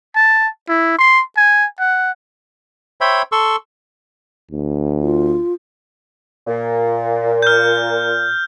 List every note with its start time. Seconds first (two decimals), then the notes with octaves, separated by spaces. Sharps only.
0.16 A5
0.69 E4
0.99 C6
1.37 G#5
1.79 F#5
3.01 C5 C#5 E5 G5 B5
3.32 A4 C6 C#6 E6
4.51 D2
5.01 F4
6.47 A#2
7.42 F6 G6